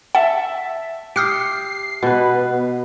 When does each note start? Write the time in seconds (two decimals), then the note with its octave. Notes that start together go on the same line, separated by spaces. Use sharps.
0.15 E5 F#5 A5
1.16 G4 D#6 F6 C7 C#7
2.03 B2 B3 B4